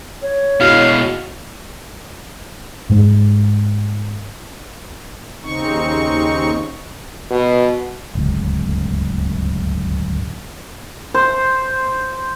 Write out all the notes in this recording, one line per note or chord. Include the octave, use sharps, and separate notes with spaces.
C#5
B2 G#3 E4 F#4 D#5 F5
G#2 G#3
D#2 C#3 C4 D#4 C#6
B2
D1 G1 C#2
C5